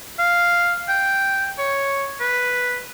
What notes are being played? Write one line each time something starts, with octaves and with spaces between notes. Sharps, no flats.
F5
G5
C#5
B4